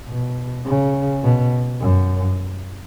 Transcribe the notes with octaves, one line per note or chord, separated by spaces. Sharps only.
B2
C#3
B2
F#2